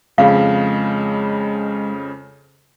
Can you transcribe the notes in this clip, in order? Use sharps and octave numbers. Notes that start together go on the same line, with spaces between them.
F2 C#3 G#3 F5